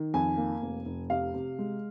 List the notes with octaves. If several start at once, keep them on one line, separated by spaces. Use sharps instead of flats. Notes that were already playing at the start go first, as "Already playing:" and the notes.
Already playing: D#3
F2 G#5
A#3
F1
F1
C3 F5
C3
G#3